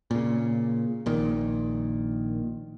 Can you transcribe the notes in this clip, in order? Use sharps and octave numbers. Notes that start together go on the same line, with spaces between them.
A#2 C#3
A#1 A#2 D#3